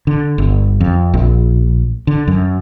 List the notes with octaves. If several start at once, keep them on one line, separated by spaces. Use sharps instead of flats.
D3
G1
F2
A#1
D3
F#2